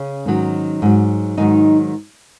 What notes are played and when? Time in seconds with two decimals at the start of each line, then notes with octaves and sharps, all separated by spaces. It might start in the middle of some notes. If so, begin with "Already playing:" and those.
Already playing: C#3 C#4
0.25 G#2 D#3 F#3
0.82 G#2 F#3
1.38 G#2 D#3 F#3 D#4